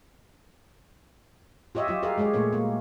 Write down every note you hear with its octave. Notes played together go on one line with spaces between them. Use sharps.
F4 G4 C#5 D#5 E5
F#3 F4 G4
G4 G#4 A#4 E5 F5
G#3 G4 G#4 C#5
A#2 A3 A#3 C#5
A#3